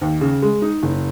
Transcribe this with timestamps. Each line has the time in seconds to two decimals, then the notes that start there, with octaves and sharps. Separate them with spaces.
0.01 D#2
0.21 C#3
0.42 G#3
0.62 D#4
0.83 F#1